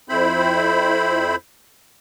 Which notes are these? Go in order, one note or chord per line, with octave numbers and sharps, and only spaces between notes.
F2 C4 E4 C5 B5